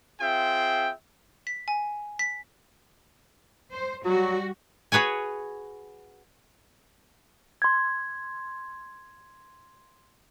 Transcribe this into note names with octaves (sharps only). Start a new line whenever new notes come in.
C4 F4 G#4 E5 G5
B6
G#5
B6
C5
F#3 G3 F#4
F#4 G#4 B4 C#5 G#5
C6 G#6